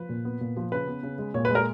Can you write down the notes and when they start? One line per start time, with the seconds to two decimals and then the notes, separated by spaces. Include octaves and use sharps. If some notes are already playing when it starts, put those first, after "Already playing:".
Already playing: F3 B4
0.09 A#2
0.25 B3
0.41 A#2
0.57 F3
0.72 C#3 B4
0.87 B3
1.03 C#3
1.18 G#3
1.34 A#2 C#5
1.45 B4
1.50 G#3
1.55 A#4